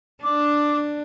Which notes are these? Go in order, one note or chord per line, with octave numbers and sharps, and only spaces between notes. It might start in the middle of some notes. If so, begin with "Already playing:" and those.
D4 D6